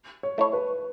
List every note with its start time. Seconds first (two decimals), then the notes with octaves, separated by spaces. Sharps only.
0.23 C#5
0.38 A3 E4 C#5
0.53 B4